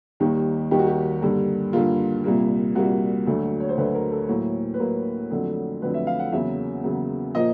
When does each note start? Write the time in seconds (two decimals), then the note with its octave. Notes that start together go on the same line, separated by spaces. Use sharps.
0.20 D#2 D#3 G3 A#3 G4
0.71 D#2 D#3 G3 A#3 G4
0.79 F#4
0.87 G4
1.22 G2 D3 G3 A#3
1.73 G2 D3 G3 A#3 F4
2.24 C2 A#2 G3 A#3
2.75 C2 A#2 G3 A#3 F#4
3.26 D2 D3 F#3 A3
3.60 C#5
3.69 C5
3.78 D2 D3 F#3 A3 B4
3.95 A#4
4.12 A4
4.29 A2 F#3 A#3
4.74 B4
4.80 A2 F#3 A#3 A#4
5.31 F2 D3 F#3 A3
5.82 F2 D3 F#3 A3 B4
5.94 E5
6.07 F5
6.19 F#5
6.32 E2 C#3 F#3 A#3 E5
6.83 E2 C#3 F#3 A#3
7.35 A#2 F3 A#3 D#5